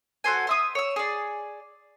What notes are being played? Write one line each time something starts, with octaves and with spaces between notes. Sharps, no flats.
F#4 A4 C5 G#5
C5 E5 D#6
C#5 E6
G#4 D5